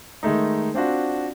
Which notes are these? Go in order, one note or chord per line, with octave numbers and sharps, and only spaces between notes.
D#3 G#3 A3 D#4
C4 D4 F4 F#4